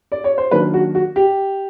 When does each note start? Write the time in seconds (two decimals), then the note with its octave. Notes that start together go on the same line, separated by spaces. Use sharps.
0.12 D5
0.24 C#5
0.38 C5
0.51 D#3 F#3 A#3 D4 B4
0.74 F#4
0.95 F#4
1.16 G4